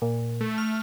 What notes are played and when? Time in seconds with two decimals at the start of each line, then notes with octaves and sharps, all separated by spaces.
0.02 A#2
0.41 A3
0.58 F6